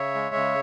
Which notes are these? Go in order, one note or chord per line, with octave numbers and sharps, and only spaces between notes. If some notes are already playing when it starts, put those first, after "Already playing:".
Already playing: C#3 C#5 E5
G#3
C#3